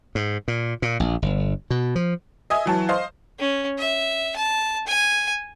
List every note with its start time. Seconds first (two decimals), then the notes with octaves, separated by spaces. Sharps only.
0.15 G#2
0.48 A#2
0.82 A#2
1.00 A#1
1.22 G1
1.70 B2
1.95 F3
2.50 D#5 E5 G#5 D#6
2.66 E3 F#3 A5
2.89 C5 D#5 F5
3.39 C#4
3.78 E5
4.36 A5
4.87 G#5